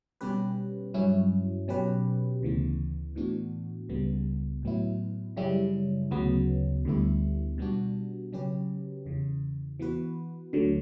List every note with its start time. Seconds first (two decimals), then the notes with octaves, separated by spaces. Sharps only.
0.21 B2 G3 C#4 G4 B4
0.94 G2 F#3 C#4 E4
1.68 B2 F#3 C#4 G4 B4
2.42 D2 C#3 E3 B3
3.15 A2 E3 B3 D4 F#4
3.89 C#2 C#3 G3 B3
4.63 A2 F#3 B3 E4
5.37 F#2 C#3 G3 C#4 E4
6.10 D2 C#3 F#3 B3
6.85 D2 D3 G3 B3 E4
7.58 B2 G3 B3 D4 F#4
8.33 C#3 F#3 C#4 G4 B4
9.06 E2 C#3 E3
9.80 E3 B3 F#4 B4
10.53 D2 D3 F#3